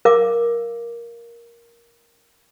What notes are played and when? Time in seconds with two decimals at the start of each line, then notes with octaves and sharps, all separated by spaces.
0.05 A#4 F5 D6